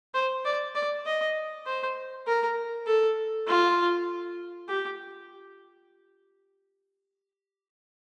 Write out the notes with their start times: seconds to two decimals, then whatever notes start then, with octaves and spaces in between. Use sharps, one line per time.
0.14 C5
0.45 D5
0.75 D5
1.06 D#5
1.66 C5
2.27 A#4
2.87 A4
3.48 F4
4.69 G4